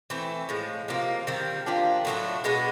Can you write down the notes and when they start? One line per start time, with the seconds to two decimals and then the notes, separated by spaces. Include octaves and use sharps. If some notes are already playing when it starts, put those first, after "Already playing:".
0.10 E3 A3 C4
0.49 A2 F3 G#3
0.88 C3 F3 A#3
1.27 D#3 G3 C4
1.66 F3 A#3 D4 G4
2.05 A2 F#3 A3 D4
2.44 B2 G#3 B3 D4